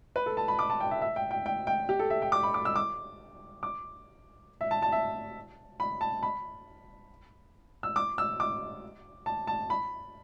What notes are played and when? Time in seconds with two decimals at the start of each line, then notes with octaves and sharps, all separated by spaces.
0.16 B4
0.26 A4
0.37 A5
0.48 B5
0.59 D6
0.70 A5
0.80 G5
0.91 E5
1.02 E5
1.16 G5
1.31 G5
1.46 G5
1.67 G5
1.89 G4
1.99 A4
2.10 E5
2.22 G5
2.32 D6
2.43 B5
2.54 D6
2.65 E6
2.76 D6
3.63 D6
4.61 E5
4.71 A5
4.82 A5
4.92 E5
5.80 B5
6.01 A5
6.23 B5
7.83 E6
7.96 D6
8.18 E6
8.40 D6
9.26 A5
9.47 A5
9.70 B5